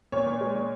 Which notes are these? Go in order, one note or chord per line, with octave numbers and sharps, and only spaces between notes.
A#2 C#5
A#2
G#3
A#2